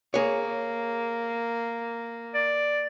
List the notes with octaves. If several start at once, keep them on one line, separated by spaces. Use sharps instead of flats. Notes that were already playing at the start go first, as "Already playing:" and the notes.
A#3 G#4 C#5
D5